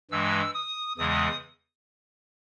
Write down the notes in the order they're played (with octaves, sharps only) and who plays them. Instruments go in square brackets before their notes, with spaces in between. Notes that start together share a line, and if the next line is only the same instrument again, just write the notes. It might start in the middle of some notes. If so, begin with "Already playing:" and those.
[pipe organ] G2 E3 G#3 E6
D#6
E2 C#3 E3 G#3 D#6